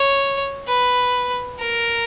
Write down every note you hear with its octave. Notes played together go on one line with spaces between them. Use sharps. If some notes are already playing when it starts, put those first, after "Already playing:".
Already playing: C#5
B4
A#4